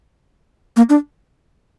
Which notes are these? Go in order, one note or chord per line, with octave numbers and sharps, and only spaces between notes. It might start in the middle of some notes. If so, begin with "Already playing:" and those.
A#3
D4